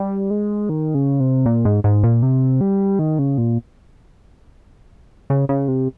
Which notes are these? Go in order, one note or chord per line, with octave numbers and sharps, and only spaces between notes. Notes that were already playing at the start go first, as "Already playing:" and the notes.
Already playing: G3
G#3
D#3
C#3
C3
A#2
G#2
G#2
A#2
C3
G3
D#3
C#3
A#2
C#3
C#3
C3